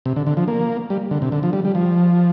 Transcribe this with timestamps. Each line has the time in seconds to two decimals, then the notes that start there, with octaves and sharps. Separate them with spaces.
0.06 C3
0.16 D3
0.27 D3
0.37 F3
0.48 A#3
0.90 G3
1.11 D3
1.22 C3
1.32 D3
1.43 F3
1.53 G3
1.65 G3
1.75 F3